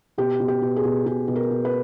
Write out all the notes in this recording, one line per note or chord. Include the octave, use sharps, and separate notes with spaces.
B2 G4
B2
G4
B2
G#4
B2
B2 G#4
B2
A#4
B2
B4